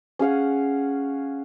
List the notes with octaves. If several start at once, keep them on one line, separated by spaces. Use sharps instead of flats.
C#4 G#4 F5 F#5